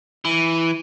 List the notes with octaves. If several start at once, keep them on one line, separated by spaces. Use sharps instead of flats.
E3